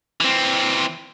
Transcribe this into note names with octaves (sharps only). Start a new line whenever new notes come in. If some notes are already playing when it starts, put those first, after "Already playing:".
E3 C4